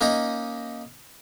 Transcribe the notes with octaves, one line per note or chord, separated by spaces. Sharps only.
A#3 C#4 D#4 A#5